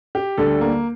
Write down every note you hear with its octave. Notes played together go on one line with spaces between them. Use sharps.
G4
D2 D3 G3 A4
A#3